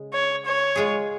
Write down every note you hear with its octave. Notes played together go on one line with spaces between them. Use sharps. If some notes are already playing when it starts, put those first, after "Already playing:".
Already playing: C#3 G#3
C#5
C#5
G#3 F4 G#4